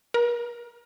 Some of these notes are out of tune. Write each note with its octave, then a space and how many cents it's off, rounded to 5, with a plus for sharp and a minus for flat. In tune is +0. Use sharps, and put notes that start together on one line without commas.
A#4 +45